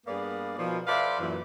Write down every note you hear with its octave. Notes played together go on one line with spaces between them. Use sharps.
G2 A#3 B3 G#4 D5
B2 D#3 F3
A4 B4 C5 D5 E5 F5
F#2 A#2 E3